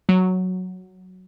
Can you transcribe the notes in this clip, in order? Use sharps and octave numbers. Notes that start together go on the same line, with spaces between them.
F#3